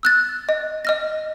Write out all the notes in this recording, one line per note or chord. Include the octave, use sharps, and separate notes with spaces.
E6 F#6 A6
D#5
D#5 F6 A#6